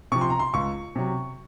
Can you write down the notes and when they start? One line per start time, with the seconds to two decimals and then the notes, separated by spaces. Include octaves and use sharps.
0.12 C3 F3 C#6
0.21 C6
0.30 A#5
0.39 C6
0.54 C#2 C#6
0.96 C3 F#3